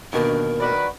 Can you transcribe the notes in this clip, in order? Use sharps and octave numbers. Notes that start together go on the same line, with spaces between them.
D#2 B2 D3 A#4
D#3 F#4 B4 D5